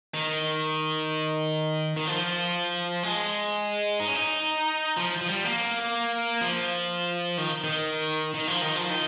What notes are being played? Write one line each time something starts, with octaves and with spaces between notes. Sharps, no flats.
D#3
D#3
F3
G#3
D#4
C#4
D#4
F3
F3
G3
A#3
F3
D#3
D#3
D#3
F3
D#3
F3
D#3